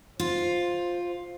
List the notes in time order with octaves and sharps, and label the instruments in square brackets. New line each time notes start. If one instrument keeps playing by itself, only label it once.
[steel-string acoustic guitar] F4 [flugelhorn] C5